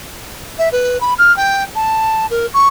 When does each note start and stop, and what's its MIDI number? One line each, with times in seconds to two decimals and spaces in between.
0.58 0.69 76
0.72 1.00 71
1.00 1.14 83
1.18 1.34 89
1.36 1.64 79
1.75 2.26 81
2.30 2.46 70
2.53 2.68 85